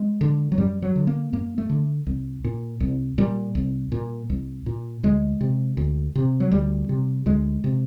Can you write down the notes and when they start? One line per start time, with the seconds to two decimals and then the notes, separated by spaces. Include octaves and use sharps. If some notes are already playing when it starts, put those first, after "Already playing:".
Already playing: G#3
0.21 D3
0.52 F#3
0.58 F#2 G3
0.82 F#3
0.96 D3
1.07 A#3
1.33 F#2 A#3
1.58 A3
1.70 D3
2.07 C2
2.44 A#2
2.80 C2
3.18 A#2 G3
3.55 C2
3.92 A#2
4.30 C2
4.66 A#2
5.03 D2 G#3
5.41 C3
5.77 D2
6.15 C3
6.40 F#3
6.52 D2 G3
6.89 C3
7.26 D2 G#3
7.64 C3